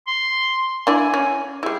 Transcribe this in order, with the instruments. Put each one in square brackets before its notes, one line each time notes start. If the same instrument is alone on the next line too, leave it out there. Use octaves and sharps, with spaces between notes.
[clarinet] C6
[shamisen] D4 E4 D5 [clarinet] G#5
[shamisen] C#4
[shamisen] G3 E4 [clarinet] G#4